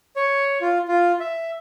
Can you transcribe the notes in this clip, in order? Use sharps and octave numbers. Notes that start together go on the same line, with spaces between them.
C#5
F4
F4
E5